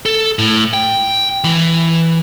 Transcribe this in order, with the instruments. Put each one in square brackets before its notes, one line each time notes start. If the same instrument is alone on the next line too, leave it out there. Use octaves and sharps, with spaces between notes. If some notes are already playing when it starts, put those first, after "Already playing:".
[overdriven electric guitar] A4
A2
G5
E3